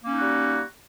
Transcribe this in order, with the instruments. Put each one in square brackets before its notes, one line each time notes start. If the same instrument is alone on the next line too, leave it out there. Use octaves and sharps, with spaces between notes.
[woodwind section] A#3
C#4
D#4
F#4
G3